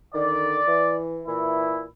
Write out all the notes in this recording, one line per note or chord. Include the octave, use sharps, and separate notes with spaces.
D3 D#3 D5
E3
A#2 E3 E4